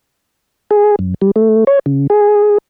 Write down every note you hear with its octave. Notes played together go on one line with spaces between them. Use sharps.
G#4
F#2
G3
A3
C#5
C#3
G#4